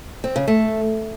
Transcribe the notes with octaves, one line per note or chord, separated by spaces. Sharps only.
C4
C#3
A3